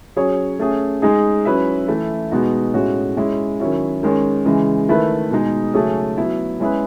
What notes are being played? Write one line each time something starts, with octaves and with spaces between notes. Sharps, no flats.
F#3 C#4 G#4 C#5
A3 C#4 G#4
G#3 D#4 G#4
F#3 C#4 E4 B4 E5
E3 A3 E4
B2 G#3 B3 D#4 F#4
A2 G#3 C#4 F#4
G#3 C#4 E4
D#3 F#3 C#4 E4
D#3 G#3 C#4
C#3 E3 G#3
D#3 A3 E4 B4
B2 G#3 D#4 G#4
C#3 F#3 A3 C#4 G#4
F#3 B3 E4
G#3 C#4 E4 G#4 B4